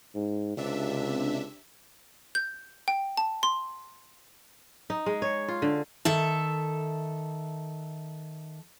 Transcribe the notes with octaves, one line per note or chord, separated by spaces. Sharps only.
G#2
C#2 C3 D4 E5
G6
G5
A5
C6
D#4
G#3
C#5
F4
D3
D#3 A4 E5 A5